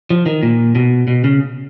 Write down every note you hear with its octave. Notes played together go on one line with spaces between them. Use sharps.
F3
D#3
A#2
B2
B2
C#3